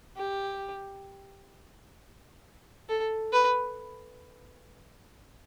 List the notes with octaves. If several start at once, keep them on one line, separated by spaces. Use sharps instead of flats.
G4
A4
B4